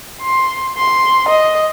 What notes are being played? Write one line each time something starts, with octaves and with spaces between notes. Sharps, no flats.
C6
C6
D#5